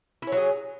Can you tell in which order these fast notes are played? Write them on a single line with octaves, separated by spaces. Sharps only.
E4 C#4 F#3 G#4